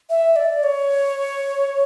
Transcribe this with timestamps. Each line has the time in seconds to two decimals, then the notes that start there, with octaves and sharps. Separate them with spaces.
0.10 E5
0.36 D5
0.63 C#5